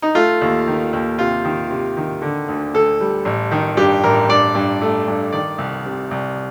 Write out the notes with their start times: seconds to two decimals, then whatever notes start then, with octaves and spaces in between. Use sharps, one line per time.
0.02 D#4
0.15 A3 F4
0.41 D#2
0.67 D#3
0.93 D#2
1.18 C3 F4
1.45 D#3
1.70 C3
1.97 D#3
2.22 D3
2.48 D2
2.74 D2 A4
3.00 G3
3.25 A1
3.51 D#3
3.77 G2 G4
4.04 A1 A#4
4.29 G2 D5
4.55 G2
4.81 A3
5.08 G2
5.32 D#3 D5
5.58 C2
5.85 C3
6.11 C2